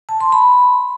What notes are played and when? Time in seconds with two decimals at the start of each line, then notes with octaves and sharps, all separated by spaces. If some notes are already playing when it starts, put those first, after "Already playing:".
0.09 A5
0.21 C6
0.32 B5